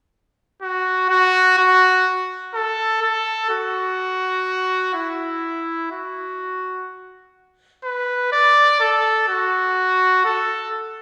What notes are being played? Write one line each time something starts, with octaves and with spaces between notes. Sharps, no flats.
F#4
F#4
F#4
A4
A4
F#4
E4
F#4
B4
D5
A4
F#4
A4